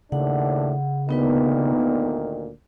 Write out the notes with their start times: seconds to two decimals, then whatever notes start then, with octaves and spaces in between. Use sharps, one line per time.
0.12 D#2 A2 C#3 D4 F#5
1.09 D2 A#2 D#3 B3 D#4 B4